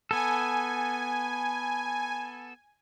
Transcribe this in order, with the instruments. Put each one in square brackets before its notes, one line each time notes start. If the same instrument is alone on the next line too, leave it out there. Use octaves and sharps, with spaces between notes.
[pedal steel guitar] B3 A4 [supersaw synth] G#5